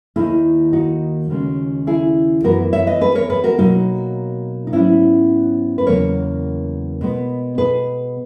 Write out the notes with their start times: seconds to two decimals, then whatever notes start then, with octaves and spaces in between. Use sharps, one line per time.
0.16 D#2 D#3 A#3 E4 G#4
0.73 D#4 F#4
1.30 D#2 C#3 G#3
1.87 E4 G#4
2.44 F#2 E3 B3 F#4 A#4
2.73 C#5 E5
2.87 B4 D#5
3.01 G#4 B4
3.15 A#4 C#5
3.30 G#4 B4
3.44 F#4 A#4
3.58 B2 F#3 A#3 D#4 F#4
4.67 D#4
4.72 G#2 F#3 B3 C#4 E4
5.78 B4
5.86 E2 C#3 F#3 A#3 A#4 C#5
7.01 B2 G#3 B3
7.58 G#4 B4